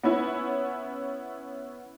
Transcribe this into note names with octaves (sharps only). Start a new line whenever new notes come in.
B3 C#4 E4